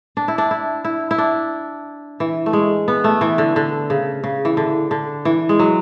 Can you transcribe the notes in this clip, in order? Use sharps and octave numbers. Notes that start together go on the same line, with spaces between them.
D4
E4
D4
E4
E4
E4
D4
E3
A3
G#3
B3
A3
E3
D3
D3
C#3
C#3
E3
D3
D3
E3
G#3
F#3